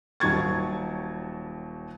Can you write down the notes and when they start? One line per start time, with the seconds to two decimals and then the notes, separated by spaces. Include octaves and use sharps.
0.20 D#1 D#2 F#3 C#6 G#6 A6